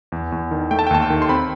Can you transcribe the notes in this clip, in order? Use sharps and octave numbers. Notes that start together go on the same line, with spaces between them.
E2
E2
D#3
A3 G5
A5
G5
D#2 A5
G5
D#3
C6
C4 B5